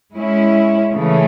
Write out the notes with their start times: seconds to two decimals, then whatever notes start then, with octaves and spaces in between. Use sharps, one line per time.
0.15 G#3 C#4 E4
0.94 C#3 E3 A3